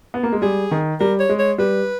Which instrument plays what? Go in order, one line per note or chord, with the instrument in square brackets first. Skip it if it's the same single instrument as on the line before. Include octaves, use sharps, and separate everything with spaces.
[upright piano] B3
A#3
G#3
[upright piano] G3 [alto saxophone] G#4
[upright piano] D#3
[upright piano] G3 [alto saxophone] A#4
[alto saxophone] C#5
[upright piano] G#3
[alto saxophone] C#5
[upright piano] G3 [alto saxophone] B4